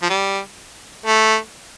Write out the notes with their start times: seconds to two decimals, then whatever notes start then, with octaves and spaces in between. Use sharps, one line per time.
0.02 F3
0.10 G3
1.06 A3